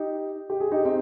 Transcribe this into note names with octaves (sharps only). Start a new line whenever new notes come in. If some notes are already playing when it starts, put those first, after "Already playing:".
Already playing: D#4 G4
G4
G#4
D#4 G4
C4 D#4